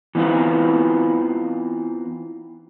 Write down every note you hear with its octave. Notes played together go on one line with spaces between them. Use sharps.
E3 B3 C4 D#4 F4 B4